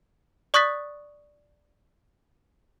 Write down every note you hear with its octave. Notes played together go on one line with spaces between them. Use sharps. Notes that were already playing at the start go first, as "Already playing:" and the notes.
D5 C#6 D#6 F#6 A6 B6